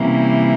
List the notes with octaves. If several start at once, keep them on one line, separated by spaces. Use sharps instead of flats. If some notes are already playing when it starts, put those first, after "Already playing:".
Already playing: C3 E3 G3 A#3 C#4